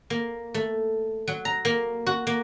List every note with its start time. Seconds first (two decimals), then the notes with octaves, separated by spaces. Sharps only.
0.10 A#3
0.54 A3
1.28 F#3
1.45 A#5
1.65 A#3
2.06 F#4
2.27 A#3